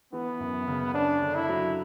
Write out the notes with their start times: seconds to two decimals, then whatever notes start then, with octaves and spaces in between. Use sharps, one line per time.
0.13 E3 B3
0.40 F#2
0.68 C#3
0.94 C#4 D4
1.21 D3
1.35 E4
1.49 F#3